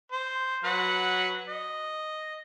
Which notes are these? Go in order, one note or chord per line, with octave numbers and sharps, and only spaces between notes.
C5
F#3 B4 F#5
D#5